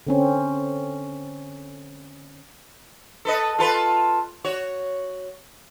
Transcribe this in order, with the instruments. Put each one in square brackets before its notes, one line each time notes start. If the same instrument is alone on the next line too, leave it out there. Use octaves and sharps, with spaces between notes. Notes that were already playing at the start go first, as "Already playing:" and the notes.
[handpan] D3 C4 C#4
[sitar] A4 B4 D#5
F4 A4 B4
F#4 C#5